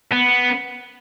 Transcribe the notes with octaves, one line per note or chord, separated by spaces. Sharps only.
B3